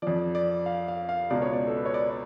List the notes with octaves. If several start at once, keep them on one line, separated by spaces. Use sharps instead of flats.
F2 F3 D5
D5
F5
F5
F5
C#2 B2 D5
C#5
D5
A4
B4
C#5
D5
D5